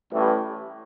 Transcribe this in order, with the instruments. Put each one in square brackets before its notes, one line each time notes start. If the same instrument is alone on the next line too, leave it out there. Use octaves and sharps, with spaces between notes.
[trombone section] A1 A2 E3 G3